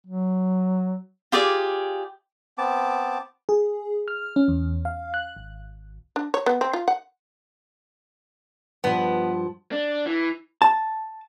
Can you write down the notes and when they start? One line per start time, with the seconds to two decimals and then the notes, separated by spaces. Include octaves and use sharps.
0.07 F#3
1.32 F4 G4 G#4 D5
2.58 B3 C4 A5 D6
3.49 G#4
4.08 F6
4.36 C#4
4.48 E2
4.85 F5
5.14 F#6
5.36 G#1
6.16 D4
6.34 C#5
6.46 B3
6.61 C4
6.73 F4
6.88 F#5
8.84 G2 F3 B3
9.72 D4
10.06 E3
10.62 A5